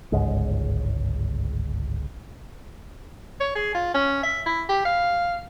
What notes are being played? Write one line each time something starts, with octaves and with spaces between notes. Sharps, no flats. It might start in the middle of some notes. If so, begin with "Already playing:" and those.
G1 C#2 G#2 G#3
C#5
G#4
F4
C#4
E5
E4
G4
F5